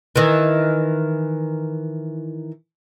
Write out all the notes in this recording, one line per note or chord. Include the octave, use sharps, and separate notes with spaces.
D#3 E3